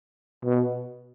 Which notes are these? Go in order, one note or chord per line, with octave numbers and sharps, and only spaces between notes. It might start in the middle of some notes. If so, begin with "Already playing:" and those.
B2